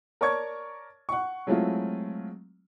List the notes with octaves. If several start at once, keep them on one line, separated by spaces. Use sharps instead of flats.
A#4 C#5 D5 A5 C#6 G#6
F#5 C#6
F#3 G#3 A3 C4 E4 F4